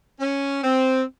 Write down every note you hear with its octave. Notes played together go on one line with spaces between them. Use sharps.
C#4
C4